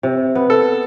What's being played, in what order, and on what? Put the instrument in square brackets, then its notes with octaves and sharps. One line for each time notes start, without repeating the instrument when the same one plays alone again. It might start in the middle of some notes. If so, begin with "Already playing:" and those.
[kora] C3
B3
[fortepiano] A4